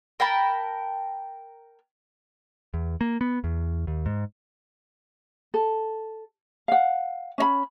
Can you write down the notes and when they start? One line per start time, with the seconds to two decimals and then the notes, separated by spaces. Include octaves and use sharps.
0.20 A#4 G5 A5 B5
2.74 E2
3.01 A#3
3.21 B3
3.44 E2
3.87 D#2
4.06 G#2
5.54 A4
6.68 F5 F#5
7.38 C#4 D#5 B5